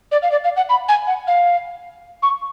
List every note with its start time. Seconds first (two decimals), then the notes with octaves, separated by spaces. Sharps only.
0.12 D5
0.23 F5
0.32 D5
0.44 F5
0.57 F#5
0.69 B5
0.89 G#5
1.07 F#5
1.28 F5
2.23 C#6